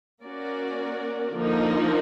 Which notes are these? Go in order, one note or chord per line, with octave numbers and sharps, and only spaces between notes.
A#3 C#4 F#4 A#4 D5
D3 F3 A#3 D#4